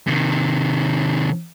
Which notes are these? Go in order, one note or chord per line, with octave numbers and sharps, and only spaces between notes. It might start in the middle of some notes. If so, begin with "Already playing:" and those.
C3 D#3